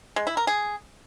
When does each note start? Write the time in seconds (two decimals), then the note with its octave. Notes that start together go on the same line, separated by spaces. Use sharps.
0.16 G#3
0.27 E4
0.37 A#4
0.47 G#4